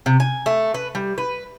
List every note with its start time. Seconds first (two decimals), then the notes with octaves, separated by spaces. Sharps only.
0.06 C3
0.20 G#5
0.46 A3
0.74 B4
0.95 G3
1.18 B4